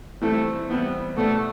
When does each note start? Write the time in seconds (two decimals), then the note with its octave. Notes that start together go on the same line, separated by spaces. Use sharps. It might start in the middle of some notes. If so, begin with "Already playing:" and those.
0.22 E3 G3 A3 C4 E4
0.69 E3 G3 B3 C4 E4
1.16 B2 A3 B3 D4